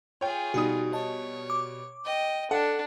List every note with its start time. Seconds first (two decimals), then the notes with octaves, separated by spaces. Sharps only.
0.21 F4 G#4 C#5 G5
0.54 B2 G3 D#4 F#4 D#6
0.93 C#5 D#5 A5
1.50 D6
2.05 D#5 G5
2.51 D4 A4 F#5